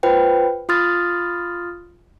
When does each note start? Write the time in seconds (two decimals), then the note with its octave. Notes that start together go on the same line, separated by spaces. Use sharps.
0.03 F4 B4 C5 G5
0.69 F4 C6 D#6 F6 A6